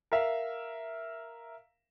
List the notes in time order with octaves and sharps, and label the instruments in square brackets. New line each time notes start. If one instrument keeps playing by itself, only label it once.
[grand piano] A#4 E5 F5